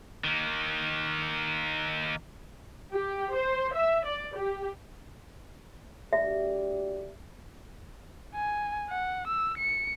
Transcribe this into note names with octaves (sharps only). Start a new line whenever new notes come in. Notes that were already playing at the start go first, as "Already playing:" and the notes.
D#3 A#3
G4
C5
E5
D5
G4
D2 G4 D5 E5
G#5
F#5
E6
C#7